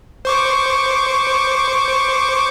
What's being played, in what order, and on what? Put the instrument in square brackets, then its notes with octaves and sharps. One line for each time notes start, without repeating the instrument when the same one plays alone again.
[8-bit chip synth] C5 C#6 D6